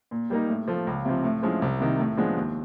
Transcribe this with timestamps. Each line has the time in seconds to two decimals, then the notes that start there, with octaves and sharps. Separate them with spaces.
0.11 A#2
0.30 G3 A#3 D#4
0.49 A2
0.68 F3 A3
0.87 C#2
1.05 C3 F3
1.24 A2
1.43 F3 G#3 C#4 E4
1.62 C2
1.80 C3 D#3
1.99 A2
2.17 F3 G#3 B3 D4
2.36 D#2